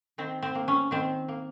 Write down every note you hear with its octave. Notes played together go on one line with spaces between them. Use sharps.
D#3 C4
C4
A#3
C#4
D#3 C4
A#3